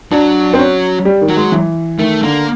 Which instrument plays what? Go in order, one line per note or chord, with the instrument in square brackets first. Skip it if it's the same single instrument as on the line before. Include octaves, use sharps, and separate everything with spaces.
[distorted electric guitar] F#3 [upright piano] D4
[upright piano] C4
C#4
G3
D#3
[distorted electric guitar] F#3
[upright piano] G#3
E3
[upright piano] D#3 [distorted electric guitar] A3
[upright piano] D3 [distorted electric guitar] A#3